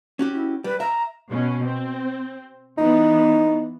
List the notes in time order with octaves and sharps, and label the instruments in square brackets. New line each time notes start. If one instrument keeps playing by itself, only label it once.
[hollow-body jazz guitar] C#4 F#4 G4
[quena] E4
[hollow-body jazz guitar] G3 [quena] B4
[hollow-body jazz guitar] E5 [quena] A#5
[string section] B2 C#4
C4
[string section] E3 B3 [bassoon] D#4